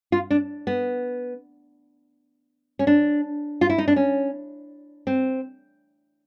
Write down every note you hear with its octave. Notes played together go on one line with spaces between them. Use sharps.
F4
D4
B3
C#4
D4
F4
E4
D#4
D4
C#4
C4